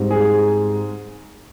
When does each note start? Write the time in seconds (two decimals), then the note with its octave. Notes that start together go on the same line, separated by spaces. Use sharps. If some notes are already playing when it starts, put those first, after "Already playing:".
Already playing: G#2 G3 C4
0.11 G#4